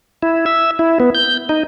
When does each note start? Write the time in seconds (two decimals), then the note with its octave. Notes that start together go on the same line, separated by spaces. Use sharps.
0.22 E4
0.46 E5
0.79 E4
1.00 B3
1.15 G6
1.49 D#4